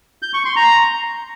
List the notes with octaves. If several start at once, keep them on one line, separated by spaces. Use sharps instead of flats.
G6
C#6
C6
A#5